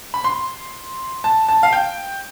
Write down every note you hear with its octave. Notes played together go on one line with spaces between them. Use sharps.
B5
C6
A5
A5
F5
G5